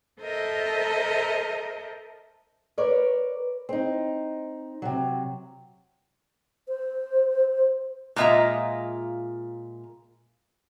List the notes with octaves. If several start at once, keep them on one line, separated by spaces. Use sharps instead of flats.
A4 A#4 C5 D#5 E5
A#4 B4 C#5 D5
C4 D#4
C3 F#3
C5
A#2 G#3 F4 D#5 E5 A#5